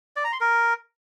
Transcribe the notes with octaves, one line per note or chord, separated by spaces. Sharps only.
D5
A#5
C6
A#4